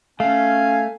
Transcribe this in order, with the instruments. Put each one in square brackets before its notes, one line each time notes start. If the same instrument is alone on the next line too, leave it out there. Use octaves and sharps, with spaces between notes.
[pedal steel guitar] A3 [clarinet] C#4 [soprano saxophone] F5 [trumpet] G#5